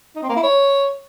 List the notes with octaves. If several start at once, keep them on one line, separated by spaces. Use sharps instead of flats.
D#4
C4
A#3
E4
C#5